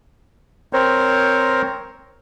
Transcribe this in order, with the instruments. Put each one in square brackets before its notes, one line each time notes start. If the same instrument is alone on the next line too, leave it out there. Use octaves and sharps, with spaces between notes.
[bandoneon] C4 A#4 C5 C#5